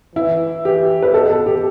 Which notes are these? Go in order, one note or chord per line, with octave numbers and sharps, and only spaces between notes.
E3 E4
E3 G4
B4
B2 A4
A4
G4